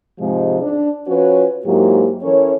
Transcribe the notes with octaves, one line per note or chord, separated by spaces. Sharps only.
G#2 C3 F3 G#3
D4
F3 C#4 F4 F#4 B4 C#5
G#2 F#3 A#3 E4 G4
E3 C#4 A4 A#4 C#5